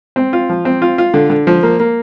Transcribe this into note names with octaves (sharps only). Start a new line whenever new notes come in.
C4
F4
F3
C4
F4
F4
D3
D3
F3
A#3
A#3